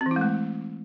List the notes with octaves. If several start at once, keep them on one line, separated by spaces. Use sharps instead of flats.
C4
E3
E4
G#3
A3